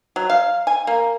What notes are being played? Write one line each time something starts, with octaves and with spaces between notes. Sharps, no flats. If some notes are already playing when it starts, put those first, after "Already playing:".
F#3
F5
G#5
A#3